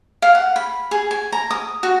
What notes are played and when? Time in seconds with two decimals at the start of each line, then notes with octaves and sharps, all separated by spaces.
0.22 F5
0.35 F#5
0.56 B5
0.91 G#4
1.11 G#5
1.32 A#5
1.51 D#6
1.83 F#4